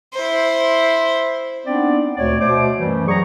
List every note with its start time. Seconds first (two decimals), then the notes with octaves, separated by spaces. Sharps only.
0.14 E4 C5
1.66 B3 C4 D4 D#4 D5
2.17 D2 A#2 C#5 D5
2.41 B2 A3 C5 D6
2.78 F#2 E3 G3 A3
3.08 F#3 G3 G#4 A#5 C#6